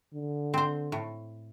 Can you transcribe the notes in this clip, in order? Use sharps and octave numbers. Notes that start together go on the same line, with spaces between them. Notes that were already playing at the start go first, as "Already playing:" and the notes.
D3
C4 C5
A2